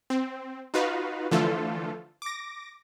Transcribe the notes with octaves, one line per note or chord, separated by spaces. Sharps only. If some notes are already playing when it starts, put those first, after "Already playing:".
C4
D#4 F4 F#4 B4 F5
D3 E3 F3 A3 F4 A4
D6 A#6